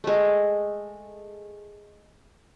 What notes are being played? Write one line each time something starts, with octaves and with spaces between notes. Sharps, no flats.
G#3 A3